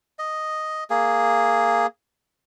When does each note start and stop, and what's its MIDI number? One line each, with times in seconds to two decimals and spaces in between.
0.19 0.84 75
0.90 1.86 58
0.90 1.86 68